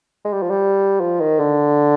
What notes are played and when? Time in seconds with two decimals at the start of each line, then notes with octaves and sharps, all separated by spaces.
0.24 G#3
0.33 G3
0.42 F3
0.50 G3
1.00 F3
1.20 D#3
1.39 D3